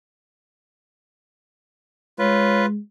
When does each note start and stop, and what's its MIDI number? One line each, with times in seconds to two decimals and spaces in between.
2.19 2.77 56
2.19 2.66 65
2.19 2.66 71
2.19 2.63 73